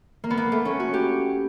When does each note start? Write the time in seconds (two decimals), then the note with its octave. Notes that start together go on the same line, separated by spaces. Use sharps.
0.24 A#3
0.30 B3
0.37 A#3
0.52 A3
0.65 C#4
0.80 F#4
0.93 G4